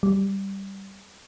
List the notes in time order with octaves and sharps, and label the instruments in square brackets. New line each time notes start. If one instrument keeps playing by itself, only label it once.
[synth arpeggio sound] G3